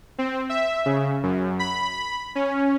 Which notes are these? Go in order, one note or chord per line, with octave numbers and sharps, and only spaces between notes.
C4
E5
C#3
F#2
B5
C#4